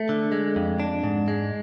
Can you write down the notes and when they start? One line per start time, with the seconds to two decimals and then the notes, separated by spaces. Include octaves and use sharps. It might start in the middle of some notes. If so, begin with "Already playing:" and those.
Already playing: A3
0.09 D3
0.32 G#3
0.56 F2
0.80 D4
1.03 G#2
1.28 G#3